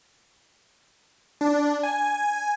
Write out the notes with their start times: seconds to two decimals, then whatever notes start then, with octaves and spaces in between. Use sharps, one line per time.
1.41 D4
1.83 G#5